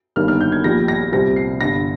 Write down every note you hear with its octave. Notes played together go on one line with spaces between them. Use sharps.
G1 G2 D#3 A#3 F6
F6
G6
G#6
A#1 A#2 G3 A#6
A#6
C2 C3 G3 C4 A#6
C7
G1 G2 D3 A#6